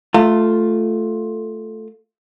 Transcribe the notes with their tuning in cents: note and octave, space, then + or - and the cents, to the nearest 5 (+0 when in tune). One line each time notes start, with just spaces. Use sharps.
A3 +0 F4 +5 A5 +45